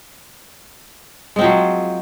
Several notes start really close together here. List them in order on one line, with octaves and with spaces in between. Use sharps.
G#3 C4 F3 F#3